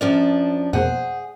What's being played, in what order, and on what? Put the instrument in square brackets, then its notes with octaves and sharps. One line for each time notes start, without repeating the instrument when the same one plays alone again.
[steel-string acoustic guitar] F#2 F3 D4 [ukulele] D5 [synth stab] F6
[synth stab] F2 B2 A#3 [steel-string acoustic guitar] G#4 [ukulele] C5 F#5